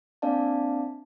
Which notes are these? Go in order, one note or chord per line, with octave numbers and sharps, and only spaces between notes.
A#3 C4 D4 D5 F5 A5